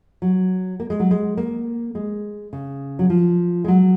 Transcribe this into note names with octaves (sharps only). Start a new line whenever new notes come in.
F#3
A#3
G#3
F#3
G#3
A#3
G#3
C#3
F#3
F3
G#3
F#3